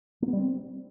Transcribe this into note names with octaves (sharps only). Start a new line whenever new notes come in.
A#3
B3
G3
C4